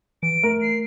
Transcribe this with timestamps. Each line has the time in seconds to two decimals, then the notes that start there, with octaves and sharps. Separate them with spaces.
0.23 E3 D7
0.43 A3 A#4
0.62 C7